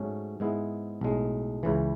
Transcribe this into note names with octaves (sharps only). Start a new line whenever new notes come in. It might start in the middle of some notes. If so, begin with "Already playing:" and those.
Already playing: G#2 F#3 A3 C#4
G#2 G#3 B3 E4
B1 A2 G#3
C#2 C#3 E3